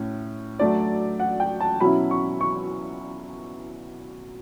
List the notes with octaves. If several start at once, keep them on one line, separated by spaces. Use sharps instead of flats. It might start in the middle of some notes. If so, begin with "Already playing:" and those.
Already playing: A2 C#4
F#3 A3 D4 D5
F#5
G5
A5
B2 F#3 C#4 E4 B5
C#6
C#6